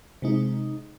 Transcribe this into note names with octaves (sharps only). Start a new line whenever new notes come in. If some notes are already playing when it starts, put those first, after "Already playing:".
C3 G#3 D#4